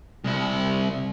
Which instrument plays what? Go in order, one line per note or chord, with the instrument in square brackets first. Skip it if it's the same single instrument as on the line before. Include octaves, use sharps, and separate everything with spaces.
[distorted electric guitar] C2 E4